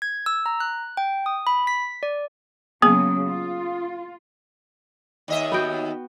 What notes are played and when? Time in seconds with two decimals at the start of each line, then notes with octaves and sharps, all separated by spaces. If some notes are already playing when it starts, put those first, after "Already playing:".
0.02 G#6
0.26 E6
0.46 A#5
0.60 F#6
0.97 G5
1.26 D#6
1.47 B5
1.67 B6
2.03 D5
2.82 C#3 F#3 A#3 B3 G#4 D#6
3.28 F4
5.28 D#2 D#5 E5
5.52 B3 F#4 G5